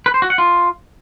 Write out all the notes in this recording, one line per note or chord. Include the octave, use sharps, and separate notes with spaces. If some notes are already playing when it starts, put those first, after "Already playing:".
B4
C5
F#4
F#5
F4